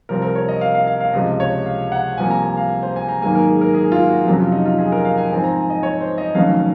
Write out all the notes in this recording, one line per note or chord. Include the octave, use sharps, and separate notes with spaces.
C2 C3 F3 C4 A#4
A#4
C#5
D#5
F5
F5
F5
F5
C#2 C3 F3 D#5
C#5
F5
F#5
C2 C3 F3 A#3 G#5
A#5
G#5
F5
C5
G#5
A#5
G#2 D#3 F#3 A#3 G#5
A#4
G#4
A#4
G#4
F4
F#4
F2 C3 F#3 C#4
F4
D#4
F4
G#4
A#4
F5
G#5
G#2 F3 C4 G#5
A#5
G#5
D#5
C#5
C5
D#5
F1 F2 D#3 F#3 C#4 F5